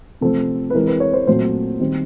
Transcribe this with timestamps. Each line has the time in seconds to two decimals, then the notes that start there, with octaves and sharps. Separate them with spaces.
0.21 C3 F3 A3 C4 A4
0.70 B4
0.74 E3 G#3 C4 A#4
0.87 B4
1.00 C#5
1.14 C5
1.27 A#2 F#3 A3 C4 C5
1.80 D#3 G3 C4